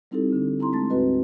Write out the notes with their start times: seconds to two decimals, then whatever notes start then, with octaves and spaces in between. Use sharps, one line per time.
0.11 G3 C4 D#4 E4 G4 A4
0.33 D3 D4
0.59 C4 E4 A#5 C6
0.73 G#3 A3 A5 A6
0.90 D2 G#2 C4 F#4 B4 D#5